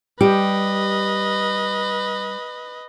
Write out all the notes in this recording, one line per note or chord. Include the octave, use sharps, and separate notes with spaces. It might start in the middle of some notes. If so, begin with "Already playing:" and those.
G3 G4 B4 D#5